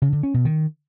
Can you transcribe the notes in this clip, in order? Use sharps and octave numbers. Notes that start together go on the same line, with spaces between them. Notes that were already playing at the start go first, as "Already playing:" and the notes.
C#3
D3
C#4
B2
D#3